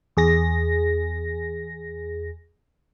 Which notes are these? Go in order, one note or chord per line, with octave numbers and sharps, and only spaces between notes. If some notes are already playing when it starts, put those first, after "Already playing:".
E2 G#4 A#6